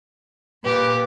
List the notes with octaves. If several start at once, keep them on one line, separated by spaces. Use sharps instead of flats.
A#2 G4 B4